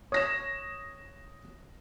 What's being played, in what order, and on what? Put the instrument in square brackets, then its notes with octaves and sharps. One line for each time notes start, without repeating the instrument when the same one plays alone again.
[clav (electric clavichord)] C#5 [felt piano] D#6 A#6 E7